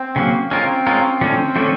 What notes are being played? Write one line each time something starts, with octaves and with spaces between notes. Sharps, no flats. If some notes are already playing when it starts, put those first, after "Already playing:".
Already playing: C4
C#3 F#3 A#3
G#3 C4 C#4 F4 A#4
G#3 C#4 F4 A#4
D3 F3 A3 C4 C#4
D3 F3 A3 C#4